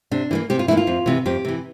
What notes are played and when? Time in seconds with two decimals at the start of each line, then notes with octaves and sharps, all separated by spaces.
0.11 C3 D4
0.31 E3 G3 A#3
0.50 C3 G4
0.59 F4
0.68 E3 G3 A#3 E4
0.77 F4
0.87 F2
1.06 C3 E3
1.26 F2 G4
1.45 C3 E3